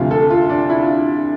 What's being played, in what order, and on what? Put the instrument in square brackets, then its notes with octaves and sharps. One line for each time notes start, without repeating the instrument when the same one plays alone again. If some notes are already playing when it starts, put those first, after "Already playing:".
Already playing: [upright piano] D2 C3 F3 F4
A4
F4
D4
E4
F4